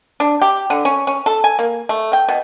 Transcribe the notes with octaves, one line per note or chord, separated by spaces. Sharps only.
D4
G4
D3
C#4
C#4
A4
G#5
A#3
A3
G5
B2